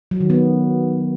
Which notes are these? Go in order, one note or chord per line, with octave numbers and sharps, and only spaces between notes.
F#3
D#3
B3